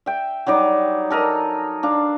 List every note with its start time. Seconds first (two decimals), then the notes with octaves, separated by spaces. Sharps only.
0.06 E5 G5
0.47 F#3 G3 D#4 D5
1.10 A4 A#4 D#5 A#5
1.83 D4 F5